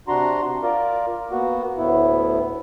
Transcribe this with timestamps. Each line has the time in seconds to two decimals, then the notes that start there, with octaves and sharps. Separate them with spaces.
0.08 C3 D4 F#4 A#5 C6
0.63 F4 A#4 D5
1.31 A#3 B3 F#4
1.77 D2 A2 B3 E4